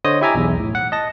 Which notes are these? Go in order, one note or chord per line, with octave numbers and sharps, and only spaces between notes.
D3 C5 C#5 D#5 D#6
E4 G4 E5 G#5 A#5 D6
B1 E2
A2
F#5
D#5 A5 A#6